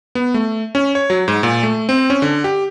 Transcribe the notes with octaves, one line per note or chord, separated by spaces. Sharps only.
B3
A3
C#4
C#5
F#3
G#2
A#2
A3
C4
C#4
D3
G4